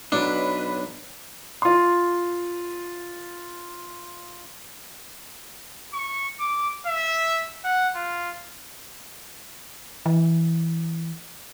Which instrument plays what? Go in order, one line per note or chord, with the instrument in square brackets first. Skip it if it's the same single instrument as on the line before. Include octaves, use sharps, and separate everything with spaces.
[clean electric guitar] B1 F#3 [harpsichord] D4 [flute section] B4 B5
[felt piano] F4 C6
[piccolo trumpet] C#6
D6
E5
F#5
F4
[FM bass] E3